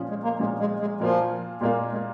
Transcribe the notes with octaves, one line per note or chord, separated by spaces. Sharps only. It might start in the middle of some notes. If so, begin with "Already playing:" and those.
Already playing: A#2 F3 C#4
G#3
A#3
A#2 F3 G#3 C#4
G#3
G#3
A#2 F3 A#3 F4
A#2 G#3 A#3 F4
G#3